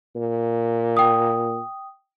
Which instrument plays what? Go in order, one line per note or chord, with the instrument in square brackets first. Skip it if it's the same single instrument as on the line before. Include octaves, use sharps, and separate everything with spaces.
[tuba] A#2
[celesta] G5 D#6